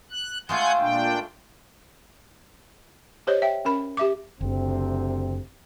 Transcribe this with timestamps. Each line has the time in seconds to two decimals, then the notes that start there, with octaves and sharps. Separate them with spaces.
0.11 F#6
0.49 G#3 A3 F4 F#5 G#5 G6
0.79 A#2 D4 G5
3.27 G4 C5 C#5 D#5
3.42 E5 G5
3.65 C#4 A#4 B5
3.97 G4 E5 D6
4.41 F#1 D2 C3 C4